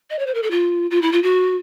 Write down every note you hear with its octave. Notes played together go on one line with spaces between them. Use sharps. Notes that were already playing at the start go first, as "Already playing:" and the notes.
D#5
C#5
C5
A#4
A4
F4
F4
E4
F4
F#4